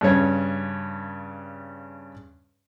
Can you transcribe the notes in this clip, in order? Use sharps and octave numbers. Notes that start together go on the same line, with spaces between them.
G2 C#3 C#5